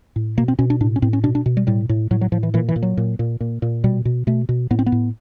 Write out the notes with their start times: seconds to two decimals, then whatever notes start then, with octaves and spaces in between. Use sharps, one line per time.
0.16 A2
0.37 B2 A#3
0.48 C4
0.59 B2 C#4
0.70 D4
0.81 A2 D4
0.96 C#4
1.02 A2 C4
1.13 C#4
1.23 B2 D4
1.35 D4
1.46 B2
1.57 G3
1.67 A2 G3
1.89 A2
2.11 A2 F#3
2.21 F#3
2.32 A2 F3
2.43 E3
2.54 A#2 E3
2.69 E3
2.76 A#2
2.83 F#3
2.97 A#2
3.19 A#2
3.40 A#2
3.62 A#2
3.84 B2 G3
4.05 B2
4.27 B2 A3
4.49 B2
4.70 A2 B3
4.79 C4
4.86 B3
4.92 A2